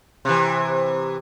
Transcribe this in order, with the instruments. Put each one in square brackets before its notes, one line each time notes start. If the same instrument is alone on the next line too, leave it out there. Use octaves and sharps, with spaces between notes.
[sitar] C3 E3